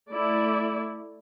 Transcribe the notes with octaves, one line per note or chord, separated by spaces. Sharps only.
A3 E4 D5